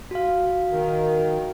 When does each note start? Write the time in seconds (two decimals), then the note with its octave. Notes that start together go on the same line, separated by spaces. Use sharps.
0.11 F#4 F5
0.70 D#3